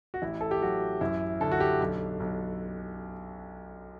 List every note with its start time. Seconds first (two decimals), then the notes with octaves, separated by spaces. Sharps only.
0.14 F#4
0.22 A1 E4
0.41 A4
0.51 G4
0.61 F#3 F#4
1.01 F#2 E4
1.41 D3 A4
1.52 F#4
1.60 G4
1.80 B1
2.20 B1